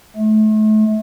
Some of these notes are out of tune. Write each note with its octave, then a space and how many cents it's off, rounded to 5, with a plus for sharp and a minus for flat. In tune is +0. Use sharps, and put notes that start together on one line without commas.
A3 -35